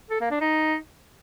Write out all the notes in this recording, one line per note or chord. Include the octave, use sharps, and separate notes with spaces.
A4
A#3
D4
D#4